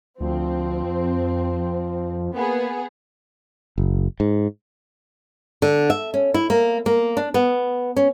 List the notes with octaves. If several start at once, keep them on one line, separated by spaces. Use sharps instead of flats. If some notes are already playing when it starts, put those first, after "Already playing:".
D2 F3 C4
F2
A#3 B3 G#4
F#1
G#2
D3
E5
C#4
E4
A#3
A#3
D4
B3
C#4